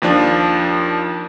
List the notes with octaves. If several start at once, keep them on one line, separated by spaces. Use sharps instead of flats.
D#2 F3 D4